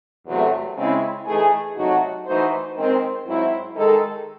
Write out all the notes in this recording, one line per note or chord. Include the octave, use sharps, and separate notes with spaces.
E2 C3 F#3 A3
C#3 G#3 C4 E4
E3 A3 D#4 G#4
C3 F#3 A3 D#4 F#4
E3 A3 D#4 F#4 C5
D#3 G#3 C4
G#2 F#3 C4 E4
D#3 G#3 D#4 A4